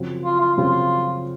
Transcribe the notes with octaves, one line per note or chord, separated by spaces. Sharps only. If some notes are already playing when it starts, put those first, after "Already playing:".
Already playing: F#2 C#3 F3 C4 F#4
F4
F4
F#2 C#3 F3 C4 F4 F#4